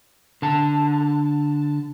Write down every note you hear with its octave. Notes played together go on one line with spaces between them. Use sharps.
D3 A5